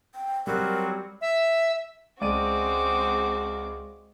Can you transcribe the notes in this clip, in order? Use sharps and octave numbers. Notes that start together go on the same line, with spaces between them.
G5
F#3 G3 C4 F#4 A#4
E5
C#2 G#3 C4 F#4 D5 D6 D#7